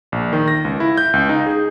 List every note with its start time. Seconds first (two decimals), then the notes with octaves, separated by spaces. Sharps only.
0.12 A#1
0.33 D#3
0.48 A#6
0.65 C#2
0.80 E4
0.97 G6
1.13 C#2
1.29 D#4
1.46 G#4